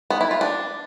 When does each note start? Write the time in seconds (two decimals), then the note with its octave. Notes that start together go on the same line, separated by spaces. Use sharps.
0.10 B3
0.21 E4
0.31 F4
0.41 D4